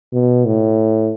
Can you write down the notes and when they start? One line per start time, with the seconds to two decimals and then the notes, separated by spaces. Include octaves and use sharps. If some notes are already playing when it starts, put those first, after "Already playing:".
0.13 B2
0.45 A2